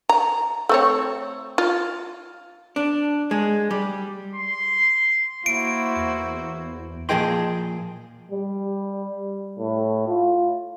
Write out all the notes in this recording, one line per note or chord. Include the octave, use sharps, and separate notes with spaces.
A#5
A3 C4 C#5
F4
D4
G#3
G3
C6
A#3 E4 F#4 C5 D7
E2
A#2 F3 G#4 D#5 G5 C6
G3
A2
F4